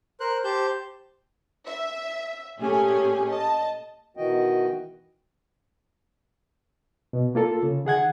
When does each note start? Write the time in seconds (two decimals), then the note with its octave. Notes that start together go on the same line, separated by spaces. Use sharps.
0.20 A#4 C5 F#6
0.44 G4 C5 A5 G6
1.66 E5
2.58 A#2 A3 C#4 G4 G#4 G#5
3.29 D#5 A5
4.17 B2 D#3 E3 F#4 D#5 G5
7.13 B2
7.35 A#3 F4 A4
7.63 C#3
7.85 D#3 G#4 F#5 G#6